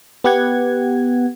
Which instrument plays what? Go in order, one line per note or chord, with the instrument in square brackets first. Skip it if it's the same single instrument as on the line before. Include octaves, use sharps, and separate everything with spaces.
[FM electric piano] B3 G4 F#5 G#6